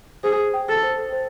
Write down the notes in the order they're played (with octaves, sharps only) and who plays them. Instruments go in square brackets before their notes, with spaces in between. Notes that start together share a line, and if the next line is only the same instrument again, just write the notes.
[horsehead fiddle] G#4 [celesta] C5
[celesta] G5
[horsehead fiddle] A4
[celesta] C5
C5